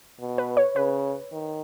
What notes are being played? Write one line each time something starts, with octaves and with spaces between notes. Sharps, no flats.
B2
B4
C#5
C#3 B4
D#3